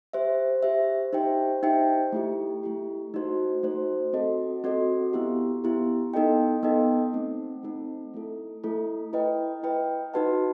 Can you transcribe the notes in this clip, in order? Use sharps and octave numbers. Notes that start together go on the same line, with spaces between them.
G4 C5 E5
G4 C5 E5
D#4 G4 C5 E5 G5
D#4 G4 C5 E5 G5
A3 E4 G4
A3 E4 G4
A3 D#4 F#4 C5
A3 D#4 F#4 C5
C4 F#4 A4 D#5
C4 F#4 A4 D#5
B3 E4 G4
B3 E4 G4
B3 D#4 A4 D#5 G5
B3 D#4 A4 D#5 G5
A3 C4 D#4
A3 C4 D#4
A3 E4 A4
A3 E4 A4
E4 B4 D#5 G5
E4 B4 D#5 G5
D#4 F#4 B4 F#5 A5